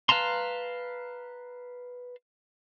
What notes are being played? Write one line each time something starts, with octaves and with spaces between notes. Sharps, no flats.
B4 F5 A5 A#5 C6